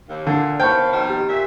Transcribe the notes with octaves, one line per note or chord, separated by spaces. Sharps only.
D#2
A#2 D3
D#2 B3 C5 F5 G5 A5 C#6
F2 B2 D#3
G4
A#2 E5